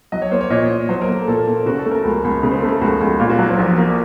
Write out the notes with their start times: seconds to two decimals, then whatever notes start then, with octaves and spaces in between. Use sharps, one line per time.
0.12 F#3 D#5
0.22 C#5
0.31 A#3 C5
0.41 C#5
0.50 A#2 D#5
0.69 A#2
0.89 F#3 C5
1.02 A#4
1.08 A#3
1.15 A4
1.27 A#2 A4
1.47 A#2
1.66 C#3 F#4
1.79 A4
1.86 A3
1.91 A#4
2.05 C#2 A4
2.24 C#2
2.43 C#3
2.51 C5
2.61 A3 A#4
2.71 A4
2.81 C#2 F#4
3.01 C#2
3.07 F#4
3.20 A#2 F4
3.29 F#4
3.39 F#3 A#4
3.49 C5
3.58 A#1 A#4
3.78 A#3